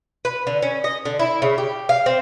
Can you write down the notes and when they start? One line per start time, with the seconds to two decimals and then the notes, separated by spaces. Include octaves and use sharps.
0.25 B4
0.47 D3
0.62 C#4
0.84 D#5
1.05 D3
1.19 E4
1.42 C#3
1.58 G4
1.89 F5
2.06 C4